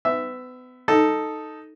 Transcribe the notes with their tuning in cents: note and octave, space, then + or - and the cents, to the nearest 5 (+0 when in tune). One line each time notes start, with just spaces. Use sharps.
B3 +35 E5 +0
D#4 +0 A4 +0